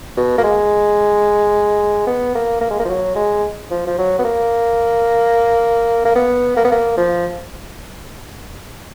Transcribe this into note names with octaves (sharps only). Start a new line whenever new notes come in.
B2
A#3
G#3
B3
A#3
A#3
G#3
A#3
F3
F#3
G#3
F3
F3
F#3
B3
A#3
A#3
B3
A#3
B3
A#3
F3